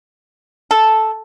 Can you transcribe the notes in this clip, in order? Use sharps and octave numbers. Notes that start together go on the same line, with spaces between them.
A4